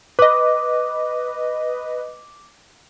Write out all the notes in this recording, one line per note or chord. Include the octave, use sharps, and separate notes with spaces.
B4 D#5 D6